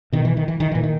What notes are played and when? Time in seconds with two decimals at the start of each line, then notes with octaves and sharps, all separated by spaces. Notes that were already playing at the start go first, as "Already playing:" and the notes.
0.12 B2 D#3
0.25 E3
0.37 D#3
0.48 E3
0.60 D#3
0.72 A#2 E3
0.83 D#3